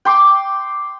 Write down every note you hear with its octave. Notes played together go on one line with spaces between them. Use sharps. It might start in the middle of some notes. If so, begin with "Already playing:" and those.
G5 C6 D6